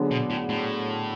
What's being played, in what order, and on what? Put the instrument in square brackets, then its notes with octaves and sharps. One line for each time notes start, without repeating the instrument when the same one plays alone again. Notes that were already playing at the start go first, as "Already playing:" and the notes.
Already playing: [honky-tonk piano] D3 F#3 B3 D4 G#4
[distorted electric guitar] B2
A2
A2